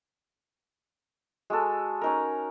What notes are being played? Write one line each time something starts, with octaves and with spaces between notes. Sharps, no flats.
G#3 F#4 A4
C#4 D#4 A#4